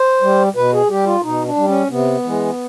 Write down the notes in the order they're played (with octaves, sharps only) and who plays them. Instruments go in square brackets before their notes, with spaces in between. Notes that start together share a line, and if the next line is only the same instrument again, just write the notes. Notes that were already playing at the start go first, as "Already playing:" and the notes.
Already playing: [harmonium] C5
G3
B2 B4
G#4
G3 G4
F4
B2 D#4
D4
G3
C#4
C3 B3
E3 G#3